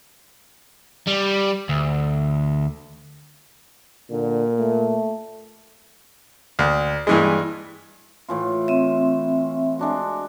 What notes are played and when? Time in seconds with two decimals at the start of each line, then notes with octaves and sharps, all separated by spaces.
1.08 G3
1.69 D2
4.11 A#2 D3
4.58 A3
6.59 D2
7.07 G2 E3 G#3
8.29 A2 E3 F4
8.68 C4 E5
9.79 G#3 D4 F#4